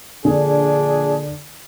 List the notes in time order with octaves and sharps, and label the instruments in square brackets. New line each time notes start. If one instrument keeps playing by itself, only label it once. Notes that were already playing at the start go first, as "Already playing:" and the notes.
[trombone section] A#1 D4 G#4 [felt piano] D3